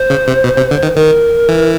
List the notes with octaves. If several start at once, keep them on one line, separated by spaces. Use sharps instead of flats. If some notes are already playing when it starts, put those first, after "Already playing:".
Already playing: C5
C#3
C3
B2
C3
D3
D#3
D#3 A#4
E3